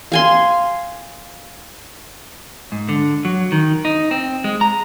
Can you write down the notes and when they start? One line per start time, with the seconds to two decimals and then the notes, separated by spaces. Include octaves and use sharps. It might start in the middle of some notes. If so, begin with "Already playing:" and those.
0.12 F5 G#5 C6
2.72 G#2
2.89 D3
3.25 F#3
3.52 D#3
3.85 D#4
4.11 C4
4.44 G#3
4.61 A#5